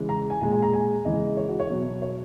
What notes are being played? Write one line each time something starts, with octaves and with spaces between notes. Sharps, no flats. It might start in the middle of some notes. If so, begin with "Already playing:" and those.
Already playing: C#3 E3 G#3
A#5
G#5
A#2 G#3 G#5
G#5
A#5
G#5
C#3 E3 G#3 D#5
C#5
F#4
C#5
B2 F#3
C#5